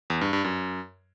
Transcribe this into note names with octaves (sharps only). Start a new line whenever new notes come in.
E2
G2
G2
F#2